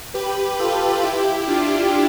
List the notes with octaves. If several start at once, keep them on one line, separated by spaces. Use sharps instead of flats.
G4 B4
F4 A4
E4 G4
D4 F4